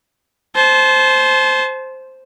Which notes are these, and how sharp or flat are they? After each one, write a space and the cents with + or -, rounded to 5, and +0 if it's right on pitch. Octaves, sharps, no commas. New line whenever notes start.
C5 +0 A5 -35